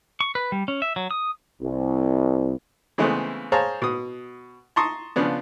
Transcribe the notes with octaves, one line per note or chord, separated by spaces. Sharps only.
C#6
B4
G3
C#4
E5
F#3
D#6
C2
C#3 E3 G#3 A3 B3 C4
G#4 C5 C#5 F5 A5 A#5
B2 D#6
A5 A#5 C6 C#6 D#6
C#3 F3 B3 D4